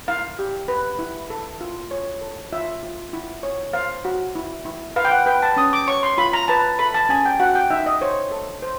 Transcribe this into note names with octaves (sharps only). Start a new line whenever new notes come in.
E4 F5
G4
B4
E4
A4
F4
C#5
A4
F4 E5
F4
E4
C#5
C5 F5
F#4
E4
E4
B4 F5
G5
F#5
B4 G5
A5
C#4 D#6
D6
C#5 C#6
C6
F4 B5
A#5
B4 A5
A4 B5
A5
C#4 G#5
G5
F#4 F#5
G5
D#4 E5
D#5
C5 C#5
A4
C5